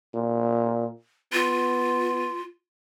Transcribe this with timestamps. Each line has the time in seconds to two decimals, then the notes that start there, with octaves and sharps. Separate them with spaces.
0.14 A#2
1.33 B3 F4